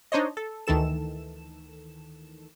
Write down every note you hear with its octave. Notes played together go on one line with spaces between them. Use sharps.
D4 D#4 C5 C#5 D#5
A4
D2 D#3 E3 A4 E7